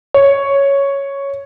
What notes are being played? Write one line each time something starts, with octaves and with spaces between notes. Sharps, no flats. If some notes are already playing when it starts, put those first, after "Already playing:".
C#5